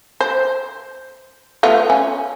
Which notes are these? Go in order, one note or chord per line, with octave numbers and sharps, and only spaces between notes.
C5
A3 B3 F4
C#4